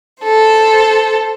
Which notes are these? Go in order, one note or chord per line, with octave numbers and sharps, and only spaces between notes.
A4 C5